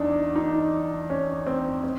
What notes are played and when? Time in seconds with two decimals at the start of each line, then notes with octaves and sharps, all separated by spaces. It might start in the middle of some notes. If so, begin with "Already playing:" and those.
Already playing: E2 D4 D#4
0.36 D#4
1.10 C#4
1.47 C4
1.84 C4